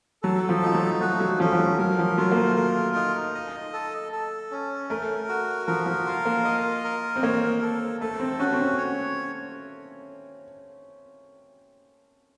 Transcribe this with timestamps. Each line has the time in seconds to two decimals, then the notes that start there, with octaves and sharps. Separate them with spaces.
0.23 F#3 A4
0.49 F3
0.62 F3 D#4
0.74 F#3
1.00 A3 F#4
1.20 F#3
1.40 F3 C#4
1.53 F3
1.59 F#3
1.79 F#3 A#4
1.99 F3
2.18 F#3 F4
2.32 A#3
2.37 A3
2.56 A#4
2.95 D#4
3.35 D#5
3.73 A4
4.12 A4
4.51 C#4
4.89 A3 A#4
5.29 F#4
5.67 F3 A#4
5.86 F3
6.06 F4
6.25 A#3
6.44 D#5
6.84 A#4
7.16 C4
7.23 A#3 C#5
7.62 A4
8.01 A3 A4
8.20 C4
8.39 C#4 F#4
8.53 C4
8.59 C#4
8.78 C#5